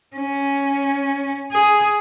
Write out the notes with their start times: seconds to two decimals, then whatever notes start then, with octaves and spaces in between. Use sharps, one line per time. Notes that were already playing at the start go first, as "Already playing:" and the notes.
0.16 C#4
1.52 G#4